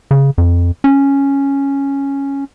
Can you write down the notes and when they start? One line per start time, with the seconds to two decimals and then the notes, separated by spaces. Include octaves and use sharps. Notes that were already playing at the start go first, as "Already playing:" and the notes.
0.11 C#3
0.38 F2
0.84 C#4